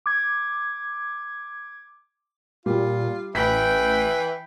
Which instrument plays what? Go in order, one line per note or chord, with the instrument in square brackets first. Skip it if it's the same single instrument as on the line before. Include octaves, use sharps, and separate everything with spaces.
[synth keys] D6 G#6
[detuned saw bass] A#2 [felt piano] G3 [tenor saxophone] F4
[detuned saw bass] A1 [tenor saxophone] E3 [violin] G5 B5 [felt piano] B6